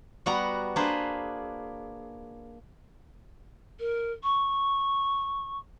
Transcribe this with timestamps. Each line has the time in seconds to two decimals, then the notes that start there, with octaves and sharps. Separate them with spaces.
0.26 G3 B3 F#4 F#5 A#5
0.76 A#3 D4 G#4 B4 C5
3.79 A#4
4.23 C#6